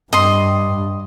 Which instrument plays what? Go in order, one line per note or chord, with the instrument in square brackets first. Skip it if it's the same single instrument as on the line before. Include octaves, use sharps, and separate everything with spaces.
[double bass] G2 [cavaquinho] D#5 C6